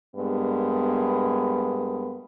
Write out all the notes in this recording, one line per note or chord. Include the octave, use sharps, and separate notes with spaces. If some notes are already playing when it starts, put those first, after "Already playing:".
G2 G#3 A#3 B3